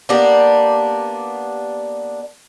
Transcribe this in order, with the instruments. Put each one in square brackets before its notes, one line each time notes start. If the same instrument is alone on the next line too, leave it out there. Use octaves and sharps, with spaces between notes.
[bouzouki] A#3 B3 D4 G4